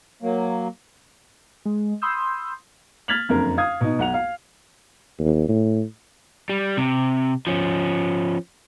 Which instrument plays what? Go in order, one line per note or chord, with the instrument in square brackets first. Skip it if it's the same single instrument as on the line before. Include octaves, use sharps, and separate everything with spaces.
[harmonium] F#3 A#3
[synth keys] G#3
B5 C6 D#6 E6 G6
[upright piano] F6 G#6 A6 B6 F7 F#7
F#1 F2 D3 A#4
F5 D#6 G#6
B2 D#4
B1 F#5 F7
F5
[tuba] D#2
A2
[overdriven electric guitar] G3
C3
F3 C#4